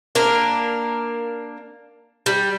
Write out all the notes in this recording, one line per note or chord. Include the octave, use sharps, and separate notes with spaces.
A#3 D4 A#4
G3